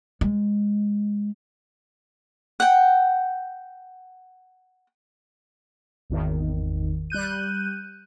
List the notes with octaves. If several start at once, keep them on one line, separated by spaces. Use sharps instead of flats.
G#3
F#5 G5
G#1 E2 D#3
G3 F#6 G6 D#7